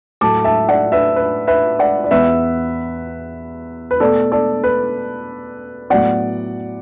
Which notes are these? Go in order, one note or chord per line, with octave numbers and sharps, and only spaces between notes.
A2 F#3 A3 A5 D6
E5 A5
D5 F#5
B4 E5
B4
B4 E5
D5 F#5
D5
E2 E3 B3 B4 E5
B4
B2 A3 A4 D5
A4 D5
B4
A2 F#3 B3 D5 F#5